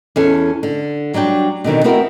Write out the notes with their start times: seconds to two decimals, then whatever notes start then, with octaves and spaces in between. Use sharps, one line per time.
0.16 E2 C#4 A4
0.63 D3
1.14 F#3 G3 D4 G5
1.64 B2 D3 D#3 C4
1.84 B3 C4 E4 F#4 A#4